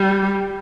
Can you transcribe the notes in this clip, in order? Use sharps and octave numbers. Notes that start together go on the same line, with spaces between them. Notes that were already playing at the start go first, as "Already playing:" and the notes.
Already playing: G3